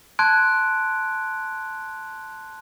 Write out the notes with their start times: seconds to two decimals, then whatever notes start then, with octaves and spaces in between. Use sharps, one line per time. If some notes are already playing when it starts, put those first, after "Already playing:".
0.19 A5 C6 F#6 G#6 D7